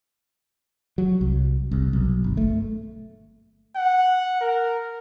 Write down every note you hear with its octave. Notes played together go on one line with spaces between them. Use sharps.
F#3
C2
C2
B1
G1
A3
F#5
A#4